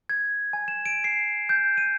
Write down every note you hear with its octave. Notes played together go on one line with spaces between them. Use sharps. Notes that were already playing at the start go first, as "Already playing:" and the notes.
G#6
G#5
E7
D7
C7
G6
D#7